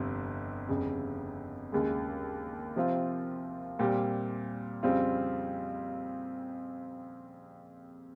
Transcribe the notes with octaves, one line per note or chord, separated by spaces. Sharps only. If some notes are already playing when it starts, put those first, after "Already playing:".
Already playing: G1 F2 C3
G1 F2 C#3
D#2 C#3 G#3
C3 F3 C4 F4
A#2 G3 C4 G4
F2 C#3 G3 C4 F4